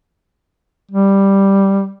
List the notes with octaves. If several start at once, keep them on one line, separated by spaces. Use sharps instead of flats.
G3